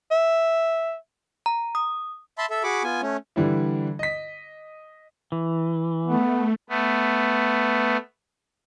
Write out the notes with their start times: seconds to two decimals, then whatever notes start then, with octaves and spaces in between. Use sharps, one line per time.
0.11 E5
1.46 A#5
1.75 D#6
2.38 E5 A5 B5 C6
2.50 A4 E5
2.63 F#4 G#4 B5 C#6 D6
2.84 B3 F4 G#5
3.02 A3 C#4
3.36 D3 E3 G3 D4 E4
3.99 D#5 B6
5.32 E3
6.08 A3 B3
6.69 A3 B3